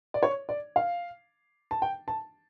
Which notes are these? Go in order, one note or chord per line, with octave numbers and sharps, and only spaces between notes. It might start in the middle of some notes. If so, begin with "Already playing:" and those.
D5
C#5
D5
F5
A5
G5
A5